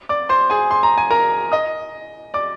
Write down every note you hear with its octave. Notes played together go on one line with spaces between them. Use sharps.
D5 D6
C5 C6
G#4 G#5
C6
A#5
G#5
A#4 A#5
D#5 D#6
D5 D6